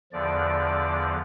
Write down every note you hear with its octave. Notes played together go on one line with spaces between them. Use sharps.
E2 D3 F3 D5